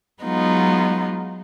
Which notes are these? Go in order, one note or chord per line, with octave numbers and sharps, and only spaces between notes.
F#3 G#3 B3 D#4 F4